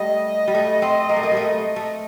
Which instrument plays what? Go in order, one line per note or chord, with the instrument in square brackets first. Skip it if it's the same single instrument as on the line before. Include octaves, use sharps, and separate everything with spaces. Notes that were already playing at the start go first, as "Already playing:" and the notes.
Already playing: [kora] G3 A3 [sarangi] D#5
[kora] G3
A3
C4
A#3
A3
A#3
G3
A3
A3